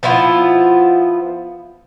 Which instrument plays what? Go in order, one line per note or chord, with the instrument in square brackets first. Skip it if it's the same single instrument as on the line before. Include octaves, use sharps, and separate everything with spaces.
[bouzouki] F3 B3 E4 F4